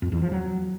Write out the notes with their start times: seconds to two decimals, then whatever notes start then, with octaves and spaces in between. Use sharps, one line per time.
0.02 F2
0.12 E2
0.22 F3
0.32 F#3